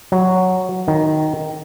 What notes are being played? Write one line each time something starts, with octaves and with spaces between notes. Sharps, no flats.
F#3
D#3